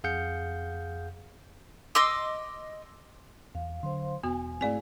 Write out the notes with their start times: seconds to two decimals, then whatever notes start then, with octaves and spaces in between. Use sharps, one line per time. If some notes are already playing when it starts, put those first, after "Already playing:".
0.04 F2 G#4 F5 F#5 G6 C#7
1.95 D#5 C6 D6 E6
3.55 E2 F5
3.83 D3 F#3 C5 F5 C6
4.23 E1 B3 F#4 G#5
4.61 G#2 A3 C4 E4 G#4 D5 G#5